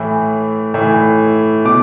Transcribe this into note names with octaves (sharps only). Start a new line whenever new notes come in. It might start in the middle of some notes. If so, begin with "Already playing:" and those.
Already playing: A2 E3
A2 E3
B2 D6